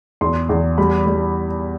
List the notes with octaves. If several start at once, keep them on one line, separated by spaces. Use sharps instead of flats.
E2 C6
E2
G3 B5
G3